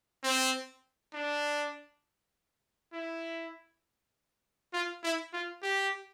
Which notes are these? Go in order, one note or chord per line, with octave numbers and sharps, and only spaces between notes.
C4
D4
E4
F4
E4
F4
G4